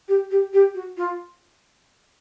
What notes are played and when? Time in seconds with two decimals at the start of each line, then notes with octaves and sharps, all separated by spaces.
0.08 G4
0.31 G4
0.53 G4
0.75 F#4
0.97 F4